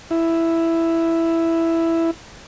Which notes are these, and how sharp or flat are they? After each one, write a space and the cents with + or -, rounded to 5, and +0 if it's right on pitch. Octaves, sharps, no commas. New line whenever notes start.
E4 +5